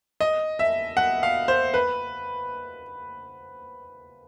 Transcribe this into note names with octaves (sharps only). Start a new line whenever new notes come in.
D#5
E5
F#5
F5
C5
B4